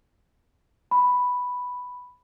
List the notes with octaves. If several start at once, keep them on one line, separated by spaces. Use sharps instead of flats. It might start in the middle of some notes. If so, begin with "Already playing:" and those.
B5